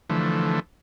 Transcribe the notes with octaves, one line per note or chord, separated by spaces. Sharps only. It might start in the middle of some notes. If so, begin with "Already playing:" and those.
D3 E3 F3 A3